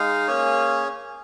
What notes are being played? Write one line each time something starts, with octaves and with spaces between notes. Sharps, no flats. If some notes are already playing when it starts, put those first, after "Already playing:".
Already playing: G#3 D#4 F5
A#3 C#4 G#4 C#5